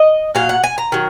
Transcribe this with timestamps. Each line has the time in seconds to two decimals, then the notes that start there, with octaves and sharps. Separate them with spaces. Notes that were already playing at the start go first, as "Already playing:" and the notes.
Already playing: D#5
0.35 A#2 F#3 F5
0.49 F#5
0.64 G#5
0.78 A#5
0.92 D#3 F#3